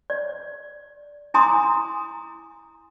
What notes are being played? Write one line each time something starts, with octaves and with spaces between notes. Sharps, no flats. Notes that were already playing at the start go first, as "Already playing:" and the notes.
D5
E4 G#5 A#5 C6 D6 D#6